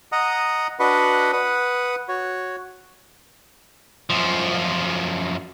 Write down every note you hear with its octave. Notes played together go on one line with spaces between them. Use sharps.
D#5 F#5 A#5 D#6
D4 F#4 B4 D#5 F#5 B5
B4 F#5 D#6
F#4 C#5
F#2 F3